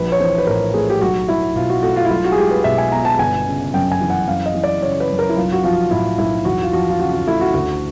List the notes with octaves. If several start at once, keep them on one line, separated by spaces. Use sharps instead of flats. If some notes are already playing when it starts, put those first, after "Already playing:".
Already playing: A#1 B4
C#5
E3 C5
B4
A2 A#4
A3 G#4
G4
B1 F#4
F#3 E4
B2 F4
F#4
A3 F#4
F4
E4
B1 F4
F#4
G#4
G#3 G4
B4
B2 E5
G#5
B3 A#5
A5
G1 G#5
C#3
F#2 G5
G#5
E3
F#5
F#2 F5
D#5
E3
D5
C#3 C#5
B4
F#2
A#4
E4
B1 F4
F#4
F3 F4
A2 E4
B1 E4
E2 F#4
F4
F3 F#4
F4
C#3 F#4
F4
A3 E4
F#4
D2 F#4